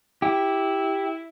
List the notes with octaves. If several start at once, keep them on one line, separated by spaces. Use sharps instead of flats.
E4 G4